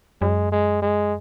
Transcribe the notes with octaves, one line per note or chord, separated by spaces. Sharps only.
F#2 G#3
G#3
G#3